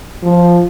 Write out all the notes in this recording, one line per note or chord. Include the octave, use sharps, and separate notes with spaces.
F3